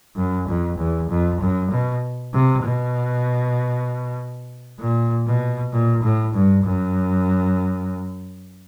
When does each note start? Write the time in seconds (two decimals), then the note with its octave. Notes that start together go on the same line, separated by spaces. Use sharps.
0.16 F#2
0.48 F2
0.78 E2
1.10 F2
1.41 F#2
1.71 B2
2.34 C3
2.64 B2
4.80 A#2
5.26 B2
5.73 A#2
6.03 A2
6.34 G2
6.65 F#2